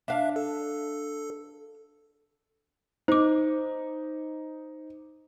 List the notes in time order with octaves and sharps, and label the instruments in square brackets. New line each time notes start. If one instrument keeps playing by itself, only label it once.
[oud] D4 F5 [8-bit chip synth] E5
[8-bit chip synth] A4
[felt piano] D#4 [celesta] C5 D6